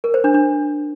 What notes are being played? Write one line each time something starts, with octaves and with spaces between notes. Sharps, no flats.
A#4
C5
D4
D4